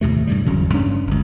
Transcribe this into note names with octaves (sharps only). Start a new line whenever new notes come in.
D#2 A2 C3 A3
G2 C3 G3
G1 E2 C#3 F#3
G2 C#4 D4
G1 C#2